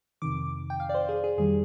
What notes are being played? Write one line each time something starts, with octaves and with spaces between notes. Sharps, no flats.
F2 C3 D#3 D6
G5
F5
D5
C5
G#4
G#4
F2 D#3 G3 G#4